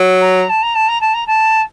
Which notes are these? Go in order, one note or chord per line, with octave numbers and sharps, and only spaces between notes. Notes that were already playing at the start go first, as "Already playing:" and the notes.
Already playing: F#3
A#5
A5
A#5
A5
A#5
A5
A#5
A5